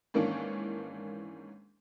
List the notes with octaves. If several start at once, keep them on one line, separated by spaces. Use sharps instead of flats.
G#2 D#3 E3 A#3 C#4 D4